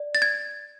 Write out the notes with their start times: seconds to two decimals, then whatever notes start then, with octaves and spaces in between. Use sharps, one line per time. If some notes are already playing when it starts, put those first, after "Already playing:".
Already playing: D5
0.15 A6
0.22 G#6